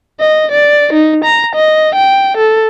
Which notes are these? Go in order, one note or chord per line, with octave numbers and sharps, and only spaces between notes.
D#5
D5
D#4
A#5
D#5
G5
A4